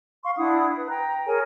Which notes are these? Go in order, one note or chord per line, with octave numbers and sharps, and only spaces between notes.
F5 C6 C#6
D4 E4 F#5 D#6
B4
G5 A#5
G#4 A#4 C#5 G#5